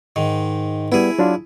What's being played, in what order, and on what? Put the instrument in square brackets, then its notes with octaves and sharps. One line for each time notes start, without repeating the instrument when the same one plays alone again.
[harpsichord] G#2 D#3
[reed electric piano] G3 B3 [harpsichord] E4 G#4
[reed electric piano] F#3 D4 F4